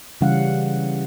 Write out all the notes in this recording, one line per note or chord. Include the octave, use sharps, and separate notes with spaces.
C#3 E3 G3 C#4 F5 F#5